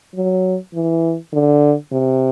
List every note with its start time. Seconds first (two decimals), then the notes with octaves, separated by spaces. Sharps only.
0.15 F#3
0.74 E3
1.33 D3
1.92 C3